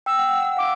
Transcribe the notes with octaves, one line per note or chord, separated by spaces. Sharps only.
G5 E6
F#5
F#5
F5 D6